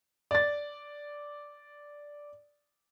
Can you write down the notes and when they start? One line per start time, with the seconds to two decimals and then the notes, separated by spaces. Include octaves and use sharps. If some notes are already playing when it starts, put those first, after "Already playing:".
0.31 D5 A6